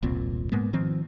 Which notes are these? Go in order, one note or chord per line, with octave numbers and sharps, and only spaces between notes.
E1 C2 A#2 C4
G#2 G#3 A#3 B3
D#3 F3 C4